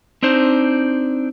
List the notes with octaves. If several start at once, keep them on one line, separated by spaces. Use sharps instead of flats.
C4 D4 D#4 C5